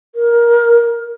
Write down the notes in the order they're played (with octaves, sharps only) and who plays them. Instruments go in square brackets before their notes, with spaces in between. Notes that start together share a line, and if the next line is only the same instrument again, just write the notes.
[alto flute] A#4